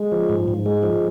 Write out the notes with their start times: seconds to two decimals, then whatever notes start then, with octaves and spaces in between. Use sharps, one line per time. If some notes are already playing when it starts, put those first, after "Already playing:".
Already playing: G#3
0.12 F3
0.29 G#2
0.48 G#2
0.66 G#3
0.83 F3